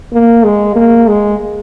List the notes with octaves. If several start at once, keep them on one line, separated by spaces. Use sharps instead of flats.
A#3
G#3
A#3
G#3